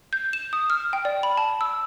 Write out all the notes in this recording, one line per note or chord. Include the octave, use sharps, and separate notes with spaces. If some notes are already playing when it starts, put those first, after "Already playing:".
G6
E7
D#6
F6
G5
D5
B5
A5
E6